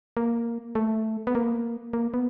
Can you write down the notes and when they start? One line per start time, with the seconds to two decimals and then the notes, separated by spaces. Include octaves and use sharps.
0.17 A#3
0.75 A3
1.27 B3
1.35 A#3
1.93 A#3
2.14 B3